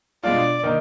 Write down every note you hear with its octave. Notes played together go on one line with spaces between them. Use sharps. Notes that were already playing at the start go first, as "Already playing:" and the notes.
B2 G#3 D4 F4 D5
D#3 A#3 D#4 A#4